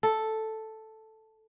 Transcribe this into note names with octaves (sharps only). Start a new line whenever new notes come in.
A4